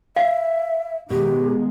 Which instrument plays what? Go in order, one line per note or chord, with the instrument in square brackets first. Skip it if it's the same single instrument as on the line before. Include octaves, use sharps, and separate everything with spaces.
[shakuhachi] E5 [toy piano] F5
[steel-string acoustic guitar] B2 [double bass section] D#3 G#3 [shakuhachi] G4